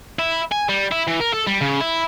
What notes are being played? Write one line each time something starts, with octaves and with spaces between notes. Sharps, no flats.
E4
G#5
G3
E4
E3
A#4
A4
G3
C#3
E4